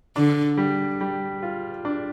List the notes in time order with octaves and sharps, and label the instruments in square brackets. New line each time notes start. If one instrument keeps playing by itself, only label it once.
[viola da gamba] D3 [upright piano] D4
[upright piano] G3
G3
F4
D4